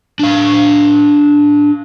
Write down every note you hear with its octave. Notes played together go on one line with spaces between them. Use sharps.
D4 F5